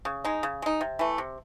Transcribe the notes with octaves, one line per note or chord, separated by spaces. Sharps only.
C#3
G#3 D#4
C#3
G#3 D#4
C3
E3 A3
C3